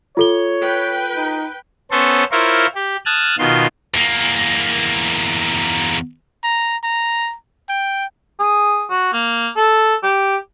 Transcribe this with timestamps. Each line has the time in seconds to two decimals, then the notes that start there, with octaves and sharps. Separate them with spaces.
0.17 F4 A4 C#5 G7
0.61 B4 G5
1.17 D#4
1.91 B3 C#4 A4 C5 C#5
2.31 E4 F4 A#4 C5 C#5
2.75 G4
3.06 A5 D#6 F6 F#6 G#6
3.39 B2 D#3 F4 C6
3.94 E2 A#3
6.43 A#5
6.83 A#5
7.69 G5
8.40 G#4
8.91 F#4
9.13 A#3
9.57 A4
10.03 G4